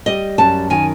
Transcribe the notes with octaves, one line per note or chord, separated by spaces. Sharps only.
G3 D#5
F#2 A5
D#3 G#5